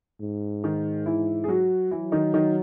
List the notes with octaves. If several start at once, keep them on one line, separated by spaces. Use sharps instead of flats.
G#2
D#3 D#4
E3 E4
G#4
F#3 F#4
E3 F#3 E4
D#3 D#4
D#3 D#4